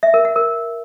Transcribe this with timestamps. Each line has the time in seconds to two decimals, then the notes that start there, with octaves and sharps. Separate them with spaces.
0.03 E5
0.14 A#4
0.25 F#5
0.36 A#4